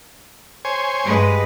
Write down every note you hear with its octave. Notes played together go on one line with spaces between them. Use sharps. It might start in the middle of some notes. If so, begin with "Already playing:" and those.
C5 C#5 G#5
G2 G#3 B4